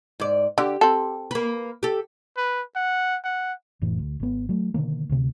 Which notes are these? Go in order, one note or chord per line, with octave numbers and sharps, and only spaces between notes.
G#2 D5
D3 G4
C4 A4
A#3 B4
G4 A4
B4
F#5
F#5
F1 A2 E3
D2
G#1 B3
F#3 A3
B2 D3 D#3 A#3
D2 C3